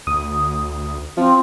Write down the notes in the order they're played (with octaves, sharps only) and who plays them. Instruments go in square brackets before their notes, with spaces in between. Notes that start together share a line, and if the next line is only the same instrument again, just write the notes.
[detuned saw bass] D2 [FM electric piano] D#6
[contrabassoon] F3 [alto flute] C4